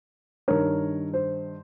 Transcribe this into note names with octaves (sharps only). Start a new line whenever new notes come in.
G2 D#3 A#4 C#5
C5